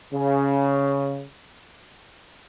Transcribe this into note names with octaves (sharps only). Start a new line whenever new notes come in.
C#3